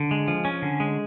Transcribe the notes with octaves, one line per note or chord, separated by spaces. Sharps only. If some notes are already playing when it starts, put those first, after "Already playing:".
Already playing: D3
G#3
F3
C#4
D3
G#3